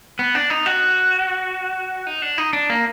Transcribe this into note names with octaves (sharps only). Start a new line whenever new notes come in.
B3
D4
D#4
F#4
D#4
D4
D#4
D4
A#3